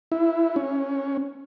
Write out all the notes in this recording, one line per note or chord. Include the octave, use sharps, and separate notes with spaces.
E4
C#4